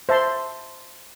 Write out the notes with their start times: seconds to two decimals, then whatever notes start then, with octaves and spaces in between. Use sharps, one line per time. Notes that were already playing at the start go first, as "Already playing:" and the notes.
0.09 C5 E5 A5 C6